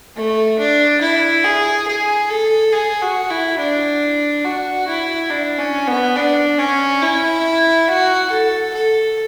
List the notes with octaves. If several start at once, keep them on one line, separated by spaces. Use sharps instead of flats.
A3
D4
E4
G#4
G#4
A4
G#4
F#4
E4
D4
F#4
E4
D4
C#4
B3
D4
C#4
E4
F#4
A4
A4